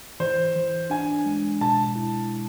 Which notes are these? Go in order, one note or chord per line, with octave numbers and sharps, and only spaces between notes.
E3 C5
E3
D4 G#5
G#3
B2 A5
E4